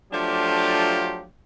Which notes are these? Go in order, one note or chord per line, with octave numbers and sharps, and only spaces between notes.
F3 F#3 A3 D4 F4 G4